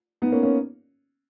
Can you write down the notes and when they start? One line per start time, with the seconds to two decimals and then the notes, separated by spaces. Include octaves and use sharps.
0.22 B3 D#4
0.32 A#3 C#4
0.42 A#3 C#4